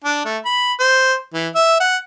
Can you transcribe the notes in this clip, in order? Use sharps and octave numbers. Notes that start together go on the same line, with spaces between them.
D4
A3
B5
C5
E3
E5
F#5